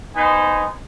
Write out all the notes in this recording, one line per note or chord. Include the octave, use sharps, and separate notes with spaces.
B3 D#4 C5 G#5